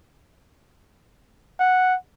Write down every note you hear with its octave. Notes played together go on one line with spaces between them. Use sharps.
F#5